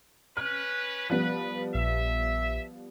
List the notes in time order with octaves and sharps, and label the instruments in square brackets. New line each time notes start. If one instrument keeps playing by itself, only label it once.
[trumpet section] C#4 B4 [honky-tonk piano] F6
[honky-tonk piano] F3 G3 B3 [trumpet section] B4
[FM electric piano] A#1 [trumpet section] E5